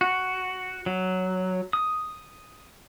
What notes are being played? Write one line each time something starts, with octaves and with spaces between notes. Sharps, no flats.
F#4
F#3
D#6